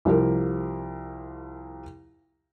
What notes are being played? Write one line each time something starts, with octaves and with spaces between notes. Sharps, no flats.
C2 F3 G4 A#4